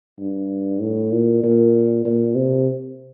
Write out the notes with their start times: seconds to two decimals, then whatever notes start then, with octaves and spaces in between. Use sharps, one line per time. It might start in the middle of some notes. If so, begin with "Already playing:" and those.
0.20 G2
0.81 A2
1.12 A#2
1.44 A#2
2.05 A#2
2.36 C3